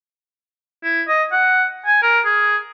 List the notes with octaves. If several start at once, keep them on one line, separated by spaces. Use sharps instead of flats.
E4
D#5
F#5
G#5
A#4
G#4